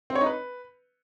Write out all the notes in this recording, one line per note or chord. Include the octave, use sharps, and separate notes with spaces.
C4
C#5
D#4
B4